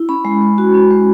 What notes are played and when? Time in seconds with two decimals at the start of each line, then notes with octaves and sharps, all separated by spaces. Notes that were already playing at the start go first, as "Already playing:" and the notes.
Already playing: E4
0.09 C#4 B5
0.25 G#3
0.42 G#3
0.58 F#4
0.74 C#4
0.90 G#3